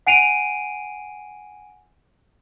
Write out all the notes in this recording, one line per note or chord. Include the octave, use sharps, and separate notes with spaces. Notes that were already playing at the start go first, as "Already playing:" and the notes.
F#5 G#5 C7 D7 D#7 F7